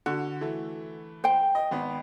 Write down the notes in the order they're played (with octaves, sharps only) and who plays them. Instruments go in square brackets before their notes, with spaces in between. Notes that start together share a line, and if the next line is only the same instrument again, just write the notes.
[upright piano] D3 [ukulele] F#4
[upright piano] E3 A3
[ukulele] C5 G5
[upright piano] D#5
G#1 B3